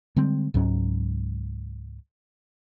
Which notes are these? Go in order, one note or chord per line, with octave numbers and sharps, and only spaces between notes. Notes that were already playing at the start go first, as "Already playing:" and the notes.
D3 G3 G#3 C4
C#2 G#2 F#3 C#4